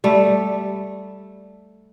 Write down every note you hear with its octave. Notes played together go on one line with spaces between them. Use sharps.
G3 A3